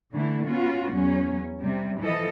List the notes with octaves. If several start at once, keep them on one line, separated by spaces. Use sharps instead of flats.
D3 E3 A3 E4
B3 C#4 F4 F#4
E2 F#3 C#4
C3 G3
E3 F3 A4 D#5